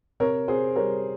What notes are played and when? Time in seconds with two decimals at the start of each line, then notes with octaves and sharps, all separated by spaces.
0.20 C3 A#4 C#5
0.48 C3 G#4 C5
0.76 G3 A#4 C#5